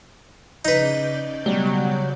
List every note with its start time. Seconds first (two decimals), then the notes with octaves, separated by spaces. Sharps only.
0.65 C#3 D#4 B4 D5 G6
1.46 B2 F#3 G3 G7